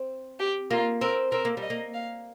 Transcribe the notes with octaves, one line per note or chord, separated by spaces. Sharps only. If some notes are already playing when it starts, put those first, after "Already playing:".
Already playing: C4
G4
A#3 F4
C4 A#4
C4 A#4
A#3
G3
D#5
A#3
F5